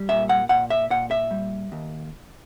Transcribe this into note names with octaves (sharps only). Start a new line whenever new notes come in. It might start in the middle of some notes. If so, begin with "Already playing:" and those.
Already playing: G3
A#2 E5
F#5
A#2 F#5
E5
A#2 F#5
E5
G3
D#2